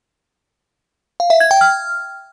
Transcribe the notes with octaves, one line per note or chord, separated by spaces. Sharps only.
F5
E5
G#6
G5
F6